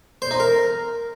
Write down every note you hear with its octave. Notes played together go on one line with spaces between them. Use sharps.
C5
D#4
A#4